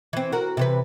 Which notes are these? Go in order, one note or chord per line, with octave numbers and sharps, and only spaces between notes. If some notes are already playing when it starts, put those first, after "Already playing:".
E3 C4
F#4 A#4
C3 E3 B4